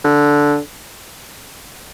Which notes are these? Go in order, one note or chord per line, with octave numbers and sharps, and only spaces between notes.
D3